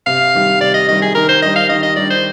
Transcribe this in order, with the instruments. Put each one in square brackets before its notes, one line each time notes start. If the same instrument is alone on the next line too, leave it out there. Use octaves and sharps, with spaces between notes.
[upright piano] C3 [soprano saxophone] F5
[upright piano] D#3 G3
[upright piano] C3 [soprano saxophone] D5
[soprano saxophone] D#5
[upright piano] D#3 G3 [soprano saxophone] D#5
[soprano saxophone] G#4
[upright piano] D#3 [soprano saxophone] A#4
[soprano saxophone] C5
[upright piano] G3 D4 [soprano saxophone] D#5
[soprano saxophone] F5
[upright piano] D#3 [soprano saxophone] D#5
[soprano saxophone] D#5
[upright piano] G3 D4 [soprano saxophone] D5
[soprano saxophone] C5